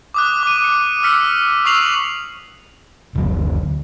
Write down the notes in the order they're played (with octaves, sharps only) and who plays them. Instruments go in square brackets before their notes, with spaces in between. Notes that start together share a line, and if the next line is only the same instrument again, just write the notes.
[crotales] D6 D#6 F#6
D6 D#7
C#7
E6 F6 B6 C#7
C#6 D#6 E6 C7 F7 F#7
[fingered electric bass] F#1 D2 D3 F#3